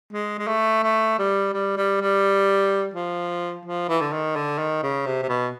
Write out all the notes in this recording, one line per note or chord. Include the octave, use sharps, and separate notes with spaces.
G#3
G#3
A3
A3
G3
G3
G3
G3
F3
F3
E3
D3
D#3
D3
D#3
C#3
C3
C3
B2